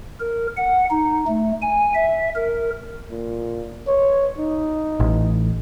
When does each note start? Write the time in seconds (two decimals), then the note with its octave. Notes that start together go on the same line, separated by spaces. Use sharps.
0.20 A#4
0.57 F#5
0.91 D#4
1.28 A3
1.62 G#5
1.95 E5
2.36 A#4
3.11 A#2
3.87 C#5
4.38 D#4
5.00 A1